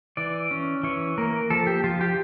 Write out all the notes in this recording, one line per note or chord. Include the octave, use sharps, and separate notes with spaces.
E3 D5
C#4
E3 C#5
A#3 A#4
F3 A4
G4
F3 F4
G4